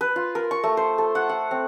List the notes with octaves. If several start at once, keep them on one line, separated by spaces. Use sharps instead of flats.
B4
F4
A#4
C#6
A3
C5
A4
F#5
F#5
C4